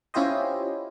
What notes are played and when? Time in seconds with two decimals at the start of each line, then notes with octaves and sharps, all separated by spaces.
0.14 C#4 E4 F4 G4 C5 D#5